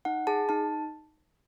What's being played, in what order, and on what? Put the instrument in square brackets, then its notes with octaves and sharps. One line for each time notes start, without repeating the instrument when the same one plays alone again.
[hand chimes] D#4 F#5
G#4 A5
D#4 A5